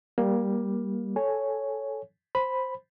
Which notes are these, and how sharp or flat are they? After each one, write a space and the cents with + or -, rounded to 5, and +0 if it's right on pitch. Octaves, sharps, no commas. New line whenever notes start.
G3 +0 A#3 +15
A4 -10 C#5 +0 G#5 +0
C5 +0 B5 +0